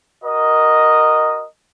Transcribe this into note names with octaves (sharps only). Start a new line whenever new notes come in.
F#4 A#4 D#5